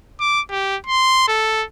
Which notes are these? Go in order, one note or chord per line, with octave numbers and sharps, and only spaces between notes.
D6
G4
C6
A4